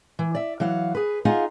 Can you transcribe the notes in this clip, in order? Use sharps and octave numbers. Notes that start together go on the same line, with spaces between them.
E3
D5 E5
E3 F#3 F5 F#5
G#4 B4
D#4 F4 G#4 F5 F#5 G#5